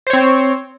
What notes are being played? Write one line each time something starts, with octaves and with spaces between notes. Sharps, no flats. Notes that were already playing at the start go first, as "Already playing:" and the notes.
C4 C5 C#5